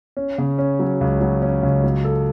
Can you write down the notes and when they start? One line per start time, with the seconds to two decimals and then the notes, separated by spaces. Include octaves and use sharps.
0.17 C#4
0.38 C#3
0.58 C#4
0.79 F#3
1.01 C#2
1.21 F#3
1.42 C#4
1.63 C#2
1.84 F#3
2.04 A4